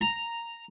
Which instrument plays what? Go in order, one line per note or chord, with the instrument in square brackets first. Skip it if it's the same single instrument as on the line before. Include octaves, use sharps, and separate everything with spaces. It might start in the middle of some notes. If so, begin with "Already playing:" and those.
[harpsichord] A#5